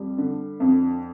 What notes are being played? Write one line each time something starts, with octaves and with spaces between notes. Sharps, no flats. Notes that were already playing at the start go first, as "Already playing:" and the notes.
Already playing: F2 G3
D3
F2